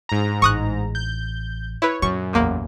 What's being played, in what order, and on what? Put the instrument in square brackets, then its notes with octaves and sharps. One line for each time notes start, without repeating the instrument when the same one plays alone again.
[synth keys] G#2 A#5
[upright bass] A1 [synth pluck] C#6 D#6 F#6
[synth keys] G6
[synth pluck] E4 B4 [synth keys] C#5
[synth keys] F#2 [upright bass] A#2 [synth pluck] C#6
[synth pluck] A1 E2 A#3